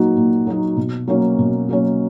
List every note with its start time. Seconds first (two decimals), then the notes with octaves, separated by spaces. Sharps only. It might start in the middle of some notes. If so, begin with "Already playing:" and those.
Already playing: A#2 F#3 A#3 D#4 F#4
0.17 A#2
0.47 F#3 A#3 D#4 F#4
0.77 B2
1.08 F#3 A#3 C#4
1.39 B2
1.69 F#3 A#3 C#4